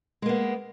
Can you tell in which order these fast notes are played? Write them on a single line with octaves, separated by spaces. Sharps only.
G#3 A#3 B3